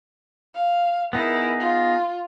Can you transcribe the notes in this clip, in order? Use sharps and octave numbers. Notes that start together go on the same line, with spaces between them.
F5
B3 D#4 E4 G#4 A#4
F4